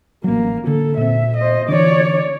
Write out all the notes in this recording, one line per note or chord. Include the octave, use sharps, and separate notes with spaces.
A1 F#3 A#3
D3 A4
A#2 C4 E5
C5 D#5
D3 E3 C#5 D5